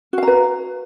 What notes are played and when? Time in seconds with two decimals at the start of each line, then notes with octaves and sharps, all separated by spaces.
0.13 F#4
0.18 F5
0.23 A#5
0.28 B4